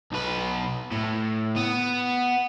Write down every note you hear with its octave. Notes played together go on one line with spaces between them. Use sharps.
B1 B4
A2
B3